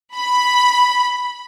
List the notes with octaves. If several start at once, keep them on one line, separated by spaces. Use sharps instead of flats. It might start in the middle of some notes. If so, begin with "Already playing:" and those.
B5